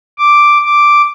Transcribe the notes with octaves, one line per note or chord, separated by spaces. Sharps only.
D6
D6